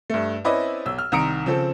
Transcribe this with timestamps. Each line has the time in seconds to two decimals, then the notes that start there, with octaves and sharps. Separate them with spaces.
0.10 G2 A3
0.44 C4 C#4 E4 B4 D5 D#5
0.86 B1 E6
0.98 F6
1.12 C2 D#3 A#5 D#6 C#7 D7
1.46 C#3 F3 C4 A4